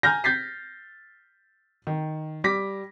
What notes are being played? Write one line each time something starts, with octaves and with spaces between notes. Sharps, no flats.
G#5 A#5 F6 G6 A#6
G6 A6 B6 C7
D#3
G3 D6 A#6 B6